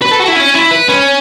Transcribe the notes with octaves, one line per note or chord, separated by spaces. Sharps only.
B4
A4
F#4
E4
C#4
E4
B4
C#4